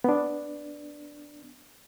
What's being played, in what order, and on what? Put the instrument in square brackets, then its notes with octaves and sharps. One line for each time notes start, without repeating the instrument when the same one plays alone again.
[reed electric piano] B3 D4